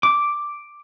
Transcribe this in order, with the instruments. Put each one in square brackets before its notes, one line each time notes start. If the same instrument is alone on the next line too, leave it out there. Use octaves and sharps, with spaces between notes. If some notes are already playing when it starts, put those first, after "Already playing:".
[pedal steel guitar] D6